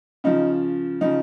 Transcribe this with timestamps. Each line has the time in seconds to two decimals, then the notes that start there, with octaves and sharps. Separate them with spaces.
0.24 C#3 F3 D#4
1.01 C#3 F3 D#4